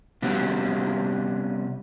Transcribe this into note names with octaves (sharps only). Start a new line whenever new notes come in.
C3 F#3 G3 B3 C#4